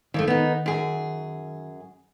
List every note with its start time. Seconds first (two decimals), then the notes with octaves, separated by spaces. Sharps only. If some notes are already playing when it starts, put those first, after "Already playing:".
0.14 F#1 F2 D#3 G3 A3
0.28 D#3 B3 D#4
0.66 F#2 G#4